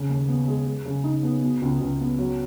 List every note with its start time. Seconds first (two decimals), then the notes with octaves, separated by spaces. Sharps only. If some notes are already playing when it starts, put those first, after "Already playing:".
Already playing: C#3
0.09 D#2
0.28 B3
0.48 G#3
0.66 G#3
0.85 C#3
1.04 D#4
1.23 B3
1.42 B2
1.62 C#2
1.81 C#2
2.00 B3
2.19 F#3